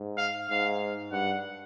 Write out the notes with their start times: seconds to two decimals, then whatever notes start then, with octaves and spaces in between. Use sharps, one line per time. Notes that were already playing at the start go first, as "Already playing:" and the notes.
Already playing: G#2
0.17 F5
0.49 G#2 F5
1.11 G2 F#5